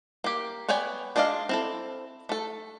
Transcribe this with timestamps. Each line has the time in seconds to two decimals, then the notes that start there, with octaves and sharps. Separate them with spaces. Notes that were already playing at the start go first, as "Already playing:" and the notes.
0.24 A#3 G4
0.68 B3 C#5 D5 G5 G#5
1.16 G#3 D4 D5 D#5 F5
1.49 C4 E4 A4
2.29 A3 A4